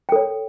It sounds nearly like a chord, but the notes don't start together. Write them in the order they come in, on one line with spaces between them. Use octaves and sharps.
G5 A4 C#5